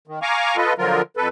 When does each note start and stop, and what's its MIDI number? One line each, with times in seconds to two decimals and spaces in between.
0.08 0.19 51
0.22 0.56 77
0.22 0.56 80
0.22 0.56 82
0.22 0.56 85
0.22 0.56 86
0.57 0.73 65
0.57 0.73 69
0.57 0.73 71
0.57 0.73 75
0.78 1.02 50
0.78 1.02 53
0.78 1.02 54
0.78 1.02 65
0.78 1.02 70
1.17 1.28 41
1.17 1.28 69
1.17 1.28 71